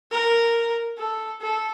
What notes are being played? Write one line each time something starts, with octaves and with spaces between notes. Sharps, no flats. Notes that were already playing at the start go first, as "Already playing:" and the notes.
A#4
A4
A4